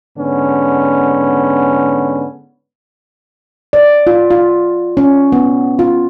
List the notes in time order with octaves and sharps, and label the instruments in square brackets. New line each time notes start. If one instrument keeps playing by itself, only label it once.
[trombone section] G#2 D3 B3 C#4
[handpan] D5
F4
F4
C#4
B3
F4